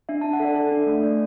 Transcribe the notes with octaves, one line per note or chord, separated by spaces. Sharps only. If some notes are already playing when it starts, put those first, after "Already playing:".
D4 E5
D4 A5
F#5
A4 D5 E5
A4
D4
A3
A3 D5